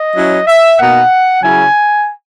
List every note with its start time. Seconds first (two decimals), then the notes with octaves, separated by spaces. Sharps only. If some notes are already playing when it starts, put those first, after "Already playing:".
Already playing: D#5
0.16 F#3 C#4 E4
0.47 E5
0.79 B2 A#3 D#4 F#5
1.43 C#3 F#3 C#4 E4 G#5